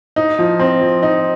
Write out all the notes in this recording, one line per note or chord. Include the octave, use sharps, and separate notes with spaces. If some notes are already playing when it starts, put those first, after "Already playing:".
D#4
F3
C4
F3
D#4